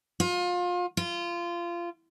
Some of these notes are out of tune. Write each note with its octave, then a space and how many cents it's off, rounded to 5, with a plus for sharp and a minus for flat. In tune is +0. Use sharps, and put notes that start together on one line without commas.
F4 +30
F4 -20